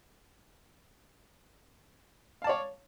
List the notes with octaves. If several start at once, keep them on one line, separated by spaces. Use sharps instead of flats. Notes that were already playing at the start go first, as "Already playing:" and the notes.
C#5 D5 F5 A5